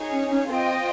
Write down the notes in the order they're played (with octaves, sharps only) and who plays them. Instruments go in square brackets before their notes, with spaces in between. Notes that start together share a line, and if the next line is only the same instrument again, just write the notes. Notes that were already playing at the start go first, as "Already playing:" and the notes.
Already playing: [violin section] D#4 G#4 C#5
[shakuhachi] C#4
C#4
[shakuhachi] C4 [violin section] F4 C5 D#5 G5